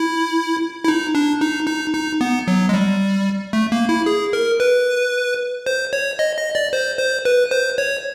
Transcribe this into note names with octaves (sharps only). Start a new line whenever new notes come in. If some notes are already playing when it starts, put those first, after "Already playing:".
Already playing: E4
E4
D#4
D4
D#4
D#4
D#4
B3
F#3
G#3
G3
A3
A#3
E4
G#4
A#4
B4
C5
C#5
D#5
D#5
D5
C5
C5
B4
C5
C#5